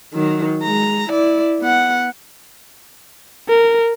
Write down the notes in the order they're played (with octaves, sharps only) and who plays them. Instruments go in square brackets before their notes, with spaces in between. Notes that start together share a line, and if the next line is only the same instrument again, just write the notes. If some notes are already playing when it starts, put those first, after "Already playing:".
[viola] D#3 F#3
G#3 A#5
E4 D5
B3 F#5
[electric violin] A#4